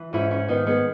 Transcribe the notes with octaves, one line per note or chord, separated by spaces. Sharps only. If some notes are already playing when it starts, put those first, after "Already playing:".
Already playing: E3
G#2 C#4 E4
C#4 E4
D#3 B3 D#4
G#3 B3